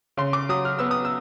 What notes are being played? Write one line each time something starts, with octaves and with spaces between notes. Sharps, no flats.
C#3 C6
D6
F#3 D#6
F6
B3 E6
D#6
E6